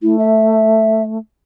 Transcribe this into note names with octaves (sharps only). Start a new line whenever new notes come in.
A3 E4
E5